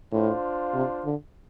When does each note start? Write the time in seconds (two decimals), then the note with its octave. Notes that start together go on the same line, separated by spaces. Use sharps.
0.12 A2 D4 F4 C5 F5
0.74 C3
1.05 D3